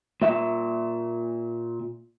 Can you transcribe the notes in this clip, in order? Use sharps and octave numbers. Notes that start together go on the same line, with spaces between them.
A#2 E5